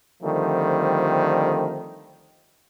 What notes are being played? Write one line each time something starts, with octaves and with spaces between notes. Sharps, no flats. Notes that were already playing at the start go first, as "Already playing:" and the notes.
D3 D#3 F3 G3 A3 C4